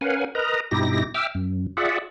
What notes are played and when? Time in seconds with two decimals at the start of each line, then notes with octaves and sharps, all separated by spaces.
0.01 C#4 A#4 B4 F5 F#5 G#5
0.35 A#4 B4 D#5 A#5
0.71 G2 B2 D#4 E4 G4 A#6
1.14 E5 G5 D6 E6 F6
1.35 F#2
1.77 F4 G#4 D5 E5 F#5